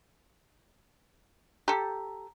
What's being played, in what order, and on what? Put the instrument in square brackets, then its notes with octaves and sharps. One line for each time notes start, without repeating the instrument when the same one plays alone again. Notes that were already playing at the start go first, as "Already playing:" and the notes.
[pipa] G4 A4 [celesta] A#5